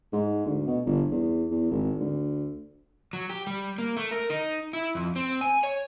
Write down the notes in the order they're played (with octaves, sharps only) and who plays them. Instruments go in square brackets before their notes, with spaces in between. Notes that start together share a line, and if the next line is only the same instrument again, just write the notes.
[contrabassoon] G#2
D2
B2
G1
E2
E2
G#1
D2
[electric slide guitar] F#3
G4
G3
A#3
A3
A#4
D#4
E4
F2
C4
G#5
C#5